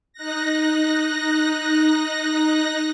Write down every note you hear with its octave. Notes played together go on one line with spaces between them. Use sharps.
D#4 F#6 A#6